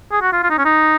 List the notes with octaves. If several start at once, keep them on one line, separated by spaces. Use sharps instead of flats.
G#4
F#4
F4
F4
D#4
C#4
D#4